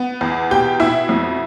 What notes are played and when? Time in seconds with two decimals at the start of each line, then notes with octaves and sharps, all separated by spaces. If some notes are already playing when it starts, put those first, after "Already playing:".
Already playing: B3
0.21 E2
0.51 B2 G4 G5
0.80 B2 E4 E5
1.09 F2